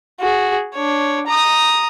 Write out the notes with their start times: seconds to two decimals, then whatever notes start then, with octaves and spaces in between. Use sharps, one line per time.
0.21 F#4 G#4
0.74 D4 C#5
1.27 A#5 D#6